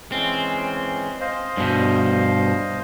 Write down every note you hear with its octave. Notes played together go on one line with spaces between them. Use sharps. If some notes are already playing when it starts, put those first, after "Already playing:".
E3 G#3 C4 C#4
C5 D#5 F5
G2 B2